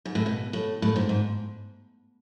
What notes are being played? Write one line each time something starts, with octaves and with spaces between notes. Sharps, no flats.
G#2
A2
B2
A2
A2
G#2
G#2